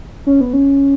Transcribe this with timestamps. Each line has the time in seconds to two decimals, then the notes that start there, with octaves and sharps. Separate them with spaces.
0.27 C#4
0.41 B3
0.53 C#4